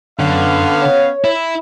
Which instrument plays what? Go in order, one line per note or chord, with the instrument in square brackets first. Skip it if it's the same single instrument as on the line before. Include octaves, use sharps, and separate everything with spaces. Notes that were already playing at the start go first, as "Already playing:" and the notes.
[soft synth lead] F#2 [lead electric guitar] D3 [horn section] B3 C#4 F5
[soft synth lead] C#5
[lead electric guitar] E4